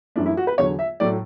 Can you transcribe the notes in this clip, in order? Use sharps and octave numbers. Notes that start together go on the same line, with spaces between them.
F#2 E3 A3 D4
E4
F#4
B4
E2 D3 F#3 C#5
E5
A2 F#3 A3 D5